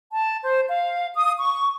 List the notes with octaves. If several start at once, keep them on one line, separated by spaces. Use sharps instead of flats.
A5
C5
F5
D#6
C#6